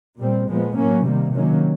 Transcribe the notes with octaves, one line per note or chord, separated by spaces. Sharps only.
A#2 G3 C4
A#2 F3 G#3 B3
A2 F#3 A#3 C#4
C3 D#3 G3 A#3
C3 D#3 F#3 A#3 C#4